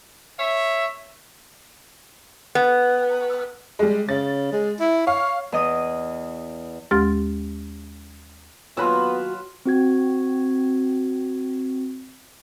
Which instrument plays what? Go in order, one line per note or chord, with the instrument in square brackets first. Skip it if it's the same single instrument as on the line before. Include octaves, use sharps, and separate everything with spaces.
[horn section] C#5 E5
[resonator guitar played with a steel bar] B3
[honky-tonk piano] G3 G#3
[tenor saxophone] C#3 [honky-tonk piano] A6
[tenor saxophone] G#3
E4
[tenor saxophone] C#5 [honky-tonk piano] F5
[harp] E2 D#5 D#6
[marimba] D#2 G#3 G4 C6 F6 A6
[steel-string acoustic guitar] D#2 F#3 F#4 [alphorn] B3 [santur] F4 B4 E6
[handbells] C4 F#4 G#6